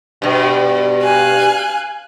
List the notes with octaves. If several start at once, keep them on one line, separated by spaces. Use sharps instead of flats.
G2 B2
F5 G#5 F#6